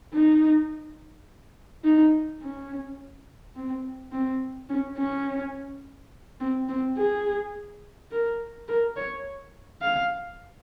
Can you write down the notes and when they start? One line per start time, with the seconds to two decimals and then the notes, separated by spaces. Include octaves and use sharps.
0.13 D#4
1.84 D#4
2.41 C#4
3.56 C4
4.12 C4
4.69 C#4
4.98 C#4
6.40 C4
6.68 C4
6.97 G#4
8.11 A#4
8.68 A#4
8.96 C#5
9.82 F5